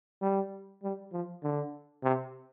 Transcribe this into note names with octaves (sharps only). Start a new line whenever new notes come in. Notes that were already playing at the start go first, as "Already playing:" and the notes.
G3
G3
F3
D3
C3